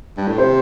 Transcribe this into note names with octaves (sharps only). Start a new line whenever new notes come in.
G2
A2
C3 C5